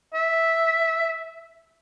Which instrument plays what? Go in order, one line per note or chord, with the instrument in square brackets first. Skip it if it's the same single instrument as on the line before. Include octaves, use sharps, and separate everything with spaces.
[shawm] E5